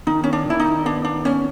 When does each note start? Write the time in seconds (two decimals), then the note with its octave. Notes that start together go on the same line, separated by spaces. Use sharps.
0.07 D#3 D#4
0.24 C#4
0.33 D4
0.46 D#3 E4
0.60 D#4
0.85 B3 D4
1.05 D4
1.25 B3 C#4